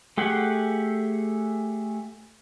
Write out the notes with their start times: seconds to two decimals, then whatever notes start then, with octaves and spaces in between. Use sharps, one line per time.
0.18 A3 G4 G#4 F#5